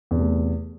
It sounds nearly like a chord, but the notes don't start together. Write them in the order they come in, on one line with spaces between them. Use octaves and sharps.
E2 C3 A3